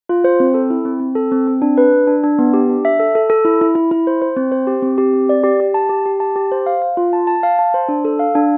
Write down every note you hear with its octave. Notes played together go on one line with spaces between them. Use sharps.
F4
C5
C4
A4
E4
C4
C4
A4
C4
C4
D4
B4
D4
D4
D4
B3
G4
D4
E5
A4
A4
A4
E4
E4
E4
E4
C5
C5
C4
C5
G4
C4
G4
C4
D5
G4
G4
A5
G4
G4
A5
G4
C5
F5
F5
F4
A5
A5
F5
A5
C5
D4
A4
F5
D4